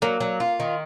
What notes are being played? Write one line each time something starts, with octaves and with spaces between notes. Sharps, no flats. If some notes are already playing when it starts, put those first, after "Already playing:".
F#3 A#3
F#3
F4
D#3